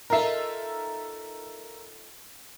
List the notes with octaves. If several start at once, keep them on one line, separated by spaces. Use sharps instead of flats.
D#4 F4 A4 A#4 E5